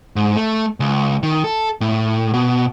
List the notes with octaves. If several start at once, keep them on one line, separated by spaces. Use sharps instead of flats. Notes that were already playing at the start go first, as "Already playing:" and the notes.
G#2
A3
C#2
D#3
A4
A2
B2